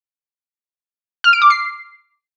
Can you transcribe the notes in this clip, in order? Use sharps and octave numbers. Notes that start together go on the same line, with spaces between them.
F6
D7
D6
C7